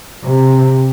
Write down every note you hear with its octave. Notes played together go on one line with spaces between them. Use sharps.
C3